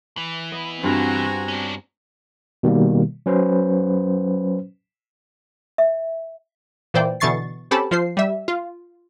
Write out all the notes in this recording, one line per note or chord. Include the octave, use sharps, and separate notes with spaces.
E3
B3 D#5
G2 C4 F4 F#4 A4 G#5 A#5
C#4 D4
B2 D#3 G3 A#3
F#3 C#4 B4 C5
E5
A#2 E3 C5 D5 G5
B2 D3 E3 C#6 A6 C7
C4 C#4 G4 A4 A5 B5
F3 F4 C5 C7
G3 E5
F4